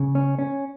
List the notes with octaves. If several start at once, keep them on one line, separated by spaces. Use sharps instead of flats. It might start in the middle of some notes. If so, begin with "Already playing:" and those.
Already playing: C#3
C#4
C#4